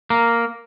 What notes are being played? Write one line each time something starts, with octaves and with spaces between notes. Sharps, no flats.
A#3